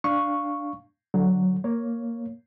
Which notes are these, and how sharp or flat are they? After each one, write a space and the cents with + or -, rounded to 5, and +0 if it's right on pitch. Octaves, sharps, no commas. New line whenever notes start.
D4 +0 F5 +0 C#6 +0
D3 +0 F#3 +0
A#3 +0 C#5 +0